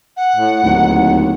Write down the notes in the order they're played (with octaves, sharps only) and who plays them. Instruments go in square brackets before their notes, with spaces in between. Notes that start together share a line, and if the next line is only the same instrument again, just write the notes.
[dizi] F#5
[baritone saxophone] A2
[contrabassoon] D1 [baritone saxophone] D#2 [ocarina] D#4